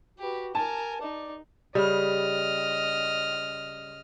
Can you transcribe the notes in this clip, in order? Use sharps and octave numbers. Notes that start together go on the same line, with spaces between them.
F#4 G4 B4
A#4 G#5 A5
D#4 D5
C#3 G3 D#5 F6